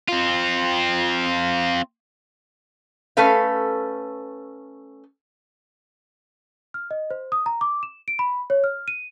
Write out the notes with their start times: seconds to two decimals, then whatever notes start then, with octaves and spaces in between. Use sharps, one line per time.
0.08 C4 F4
3.17 A3 C#4 A4 B4 F5
6.74 F6
6.91 D#5
7.11 C5
7.32 D#6
7.46 A#5
7.61 D6
7.83 E7
8.08 D7
8.19 B5
8.50 C#5
8.64 F6
8.88 D#7